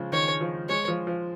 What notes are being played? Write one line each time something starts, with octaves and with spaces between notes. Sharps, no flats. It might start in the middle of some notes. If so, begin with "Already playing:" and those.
Already playing: C#3 F3 G#3
D#3 C#5
F3
G#3 C#5
F3
F3